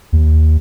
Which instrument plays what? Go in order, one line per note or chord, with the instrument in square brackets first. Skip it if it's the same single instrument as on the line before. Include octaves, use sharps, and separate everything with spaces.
[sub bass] D#2